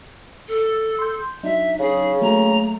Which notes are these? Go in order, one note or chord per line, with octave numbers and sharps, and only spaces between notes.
A4
C6 G6
F#3 D4 D#4 E5
C#3 G#4
F#3 A3 A#3 A#5